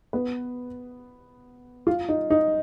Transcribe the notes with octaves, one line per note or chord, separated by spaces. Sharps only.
B3 B4
F4
D#4
D#4